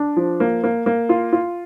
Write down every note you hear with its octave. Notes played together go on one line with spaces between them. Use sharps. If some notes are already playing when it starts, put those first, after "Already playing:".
Already playing: D4
F3
A#3
A#3
A#3
F4
F4